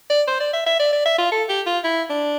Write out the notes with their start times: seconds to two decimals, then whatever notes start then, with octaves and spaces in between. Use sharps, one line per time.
0.10 D5
0.28 C5
0.40 D5
0.53 E5
0.66 E5
0.79 D5
0.93 D5
1.06 E5
1.18 F4
1.32 A4
1.49 G4
1.66 F4
1.84 E4
2.10 D4